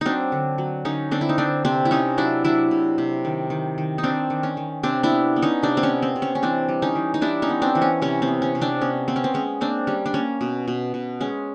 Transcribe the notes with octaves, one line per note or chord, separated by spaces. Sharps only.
F#3 C4 D4 D#4
D3
F#3
D3 C#4 D#4
D3 C4 D4
E4
D#4
D3 C4 D4
C3 C4 D4
E4
C3 C#4 D#4
F#3 D4 E4
F#3 D4 E4
C3
C3
D#3
D#3
D#3
D#4
D#3 C4 D4
D#3
C#4
D#3
C3 C4 D4
D4 E4
B3
B3
C#4 D#4
C3 C4 D4
C4
C#4
B3
C4
C3
C#4
C#4
E3 C4 D4
G3
C#4 D#4
E3
D#4
G3 D4 E4
C#4 D#4
B3
C4 D4
E3
C#4
C3 C#4
C4
B3
C#4
C3
C4 D4
B3 C#4
B3 C4
C#4
C4
G#3 C#4
A#3 C4 D4
G3 C#4
D4
A#3 C#4
B2
B2
B2
G#3 C#4